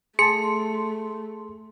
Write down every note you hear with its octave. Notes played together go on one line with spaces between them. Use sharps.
A3 G#4 A5 C6 C#7